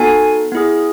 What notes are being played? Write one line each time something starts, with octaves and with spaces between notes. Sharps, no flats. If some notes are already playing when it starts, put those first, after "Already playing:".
Already playing: B3 D#4 F#4 A4 G#5
B3 E4 G#4